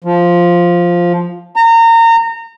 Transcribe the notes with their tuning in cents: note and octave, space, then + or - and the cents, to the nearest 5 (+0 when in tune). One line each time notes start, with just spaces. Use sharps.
F3 +0
A#5 -30